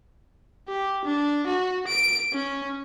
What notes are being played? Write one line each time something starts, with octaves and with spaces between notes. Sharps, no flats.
G4
D4
F#4
D7
C#4